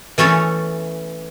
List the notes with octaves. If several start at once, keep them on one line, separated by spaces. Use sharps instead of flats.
E3 A3 C#4 A4 C#5